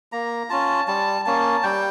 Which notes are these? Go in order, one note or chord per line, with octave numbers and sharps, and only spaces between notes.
A#3 A#5
C#4 F4 A5
G3 A5
A#3 C#4 A5
G3 G5